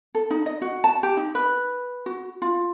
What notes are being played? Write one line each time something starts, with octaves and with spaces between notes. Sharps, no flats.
A4
D#4
D#5
F#4
A5
G4
D#4
B4
F#4
F4